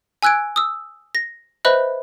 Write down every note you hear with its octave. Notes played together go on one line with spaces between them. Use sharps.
G#5 E6 F#6 G#6 D7
D#6 E6
A#6
B4 C5 D#5 E5 B5 F#6